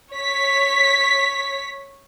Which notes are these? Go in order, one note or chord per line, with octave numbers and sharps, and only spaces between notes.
C#5 B6